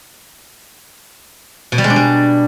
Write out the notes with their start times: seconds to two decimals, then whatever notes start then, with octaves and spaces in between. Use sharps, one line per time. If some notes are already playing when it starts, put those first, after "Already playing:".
1.72 B2
1.78 G3
1.84 G#3
1.90 D4
1.96 G3